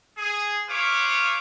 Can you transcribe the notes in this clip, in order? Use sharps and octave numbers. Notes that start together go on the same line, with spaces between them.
G#4
E4 F4 B4 C#5 F5 D6